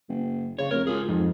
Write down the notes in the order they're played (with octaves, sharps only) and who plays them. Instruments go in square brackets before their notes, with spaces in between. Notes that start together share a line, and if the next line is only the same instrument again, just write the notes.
[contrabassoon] F#1
[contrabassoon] C#3 [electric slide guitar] C#5
[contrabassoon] F1 [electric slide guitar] A#4
[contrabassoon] C#2 [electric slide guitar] G#4 A#4
[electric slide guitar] F2 [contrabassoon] G#2